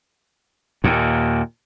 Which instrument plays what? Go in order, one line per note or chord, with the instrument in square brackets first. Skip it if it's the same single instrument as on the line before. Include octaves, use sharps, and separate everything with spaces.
[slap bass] D#2 A#2